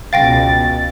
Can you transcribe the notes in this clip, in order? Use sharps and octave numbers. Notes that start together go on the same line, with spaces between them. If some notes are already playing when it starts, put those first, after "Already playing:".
C#2 B2 F5 G5 A6 A#6